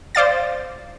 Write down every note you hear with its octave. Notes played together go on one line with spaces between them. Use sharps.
C5 D5 F5 A6